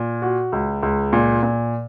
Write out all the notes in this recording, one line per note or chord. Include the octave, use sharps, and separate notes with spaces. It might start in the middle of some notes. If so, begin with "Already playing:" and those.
Already playing: A#2
F#4
C#2
C#2
A#2
A#2